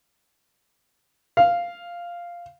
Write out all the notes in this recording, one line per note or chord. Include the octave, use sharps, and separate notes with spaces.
F5